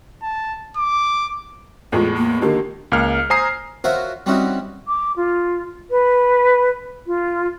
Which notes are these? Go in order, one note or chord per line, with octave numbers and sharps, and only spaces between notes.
A5
D6
E2 A2 G#3 F4
A#3
D3 D#3 A#3 G4
C#2 A#3 F6
C5 G#5 A#5 D#6 C7
F4 F#4 A#4 C5 C#5 E5
G3 C4 C#4 D#4 E4 F#4
D6
F4
B4
F4